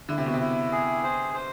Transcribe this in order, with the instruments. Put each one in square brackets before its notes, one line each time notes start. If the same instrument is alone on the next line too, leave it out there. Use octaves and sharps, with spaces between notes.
[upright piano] D3 [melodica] E4
[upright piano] C3
B2
C3
[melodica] E4
G#4
C5
C5